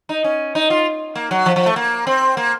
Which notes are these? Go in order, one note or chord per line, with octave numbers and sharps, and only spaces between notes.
D#4
C#4
D#4
F4
A#3
F#3
F3
F3
A3
A#3
C4
A#3